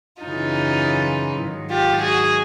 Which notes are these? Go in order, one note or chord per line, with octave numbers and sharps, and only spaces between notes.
F#2 C#3 E3 D#4 F4
G#2 D#3 F#3
F4 G4
F#4 G#4